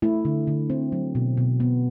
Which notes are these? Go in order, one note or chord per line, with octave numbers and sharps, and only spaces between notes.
A3 E4
D3
D3
C4
F#3
B2
B2
B3